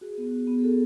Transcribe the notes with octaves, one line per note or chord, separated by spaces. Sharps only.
F#4 G#4
B3
F#4
B3
G#4
F#4 A4